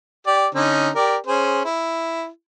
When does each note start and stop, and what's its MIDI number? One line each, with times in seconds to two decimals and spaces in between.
0.27 0.47 67
0.27 0.47 74
0.55 0.90 50
0.55 0.90 61
0.55 0.90 63
0.95 1.17 67
0.95 1.17 70
0.95 1.17 74
1.26 1.63 61
1.26 1.63 68
1.26 1.63 72
1.65 2.28 64